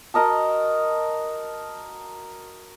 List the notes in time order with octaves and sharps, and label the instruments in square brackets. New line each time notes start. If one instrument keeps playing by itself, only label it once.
[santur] F#4 A#4 D#5 A5